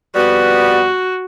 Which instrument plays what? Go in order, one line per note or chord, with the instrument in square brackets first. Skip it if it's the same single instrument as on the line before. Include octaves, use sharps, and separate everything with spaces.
[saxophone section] F2 G3 B3 [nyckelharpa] F#4